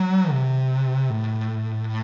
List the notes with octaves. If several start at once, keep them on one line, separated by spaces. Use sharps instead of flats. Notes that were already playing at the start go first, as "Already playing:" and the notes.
Already playing: F#3
C3
A2